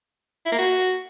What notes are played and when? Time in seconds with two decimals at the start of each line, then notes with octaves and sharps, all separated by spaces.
0.46 E4
0.52 A#3
0.58 F#4